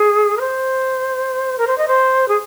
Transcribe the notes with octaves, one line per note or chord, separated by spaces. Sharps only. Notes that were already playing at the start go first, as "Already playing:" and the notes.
Already playing: G#4
A#4
C5
A#4
C5
D#5
C5
G#4